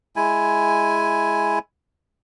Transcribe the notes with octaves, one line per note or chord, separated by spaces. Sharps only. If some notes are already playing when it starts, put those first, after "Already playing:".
G#3 E4 G#5